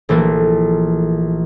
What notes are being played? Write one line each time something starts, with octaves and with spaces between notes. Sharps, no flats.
A#1 E3 A3 A#3